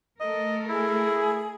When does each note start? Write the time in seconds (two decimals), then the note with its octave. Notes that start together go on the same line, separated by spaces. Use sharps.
0.20 A3 A4 A#4 D#5
0.69 E4 G#4